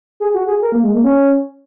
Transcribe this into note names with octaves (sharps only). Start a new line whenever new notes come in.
G#4
F#4
G#4
A#4
A#3
G#3
A#3
C#4